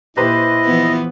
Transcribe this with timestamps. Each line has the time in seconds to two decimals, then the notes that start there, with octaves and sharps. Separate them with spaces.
0.17 A#2 E4 G4 B4 C5 D#5
0.65 E3 F3 B3